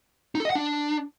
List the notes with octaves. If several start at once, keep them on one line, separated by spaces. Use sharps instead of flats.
D#4
A4
D#5
F#5
D4